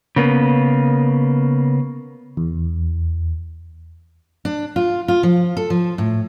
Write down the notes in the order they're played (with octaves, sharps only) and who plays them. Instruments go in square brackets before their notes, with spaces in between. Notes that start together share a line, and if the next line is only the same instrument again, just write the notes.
[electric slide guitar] C#3 A#3 B3
[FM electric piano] E2
[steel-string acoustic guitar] D4
F4
F4
F3
A4
F3
A2